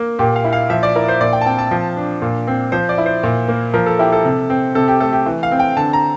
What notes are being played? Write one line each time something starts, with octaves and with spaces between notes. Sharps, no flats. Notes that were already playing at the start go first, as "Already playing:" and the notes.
Already playing: A#3
A#2 G4
F5
E4
F5
F3 E5
D5
E4 A#4
C5
A#2 D5
G5
A5
C4 G5
A5
F3
D4
A#2
C4
F3 C5
D5
E4
C5
A#2
A#3
F3 A#4
A4
E4 G4
A4
C3
C4
C3 A4
G4
A3 A4
G4
E3
F5
C4
G5
D3 A5
A#5